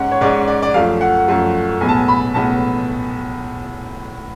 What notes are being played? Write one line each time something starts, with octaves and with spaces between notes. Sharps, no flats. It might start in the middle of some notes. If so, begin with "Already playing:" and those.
Already playing: G#2 G#3 C#4 F#5
C#5
G#2 G#3 C#4 D5
D5
D5
F#2 F3 A3 F5
F#5
F#2 F3 A3
B1 A2 G#3 B3 G#5
A5
G#5
B5
B1 A2 G#3 B3 A5